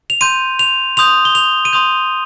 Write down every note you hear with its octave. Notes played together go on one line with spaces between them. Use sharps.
F7
C6 G6 D#7
F7
C6 D#6 G6 F7
G7
F7
D#7
C6 D#6 G6 F7